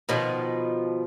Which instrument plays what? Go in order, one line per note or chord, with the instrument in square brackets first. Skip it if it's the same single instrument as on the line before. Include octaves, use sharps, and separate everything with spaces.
[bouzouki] B2 D#3 F3